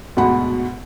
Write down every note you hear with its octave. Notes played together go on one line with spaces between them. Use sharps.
D2 G#2 B2 F#5 B5